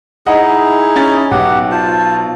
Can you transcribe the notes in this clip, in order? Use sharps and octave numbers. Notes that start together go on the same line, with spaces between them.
D#4 E4 G#4 D#5 F#5
C#4 A6
B1 B2 G4 F#5
F4 C5 A5